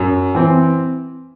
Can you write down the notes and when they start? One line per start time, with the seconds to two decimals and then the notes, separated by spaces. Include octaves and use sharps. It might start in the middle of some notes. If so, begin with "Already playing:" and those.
Already playing: F#2
0.35 E3 C4